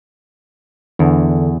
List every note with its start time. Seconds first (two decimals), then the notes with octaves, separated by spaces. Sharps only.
0.99 E2 D3